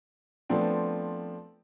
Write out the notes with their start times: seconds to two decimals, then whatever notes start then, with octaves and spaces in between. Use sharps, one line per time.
0.49 F3 A3 B3 C4 D4